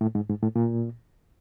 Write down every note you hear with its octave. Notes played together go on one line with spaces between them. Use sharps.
A2
G#2
G#2
A2
A#2